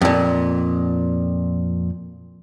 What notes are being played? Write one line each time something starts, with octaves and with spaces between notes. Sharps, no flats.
F2 A#2